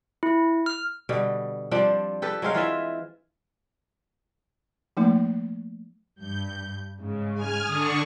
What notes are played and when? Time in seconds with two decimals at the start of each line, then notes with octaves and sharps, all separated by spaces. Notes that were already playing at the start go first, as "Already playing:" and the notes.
0.23 E4
0.66 F6
1.09 B2 D3 G3
1.71 F3 G3 C4 D4
2.22 G4 A4 B4
2.42 F#3 G#3 C4 F5
2.55 E3 F4 E5
4.97 F3 A3 A#3 D#4
6.22 G2 G6
7.02 G#2 C#3
7.34 G#5 F6
7.67 D3 D4 C#6 D#6